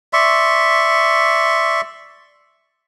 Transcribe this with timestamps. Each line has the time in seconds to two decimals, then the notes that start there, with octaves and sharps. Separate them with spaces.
0.13 D5 E5 C6 C#6